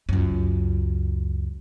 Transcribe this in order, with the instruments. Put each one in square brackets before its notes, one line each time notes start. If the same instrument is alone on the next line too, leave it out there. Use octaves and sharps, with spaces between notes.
[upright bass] C#2 F#2